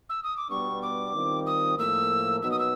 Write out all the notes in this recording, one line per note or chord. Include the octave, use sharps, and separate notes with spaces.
E6
D#6
D6
B2 G3 B3 D4 C#6
D6
D#3 G3 C4 F4
D#6
A2 F3 A#3 E6
B2 F#3 B3 D#4 E6
D#6
E6